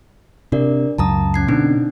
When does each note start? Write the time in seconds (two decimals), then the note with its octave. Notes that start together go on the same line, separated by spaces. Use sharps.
0.52 C3 D4 A#4 D5
0.98 C#2 F#2 A5 A#5 D#6
1.34 C#4 G#6 C7
1.48 B2 D3 C4 D4 D#4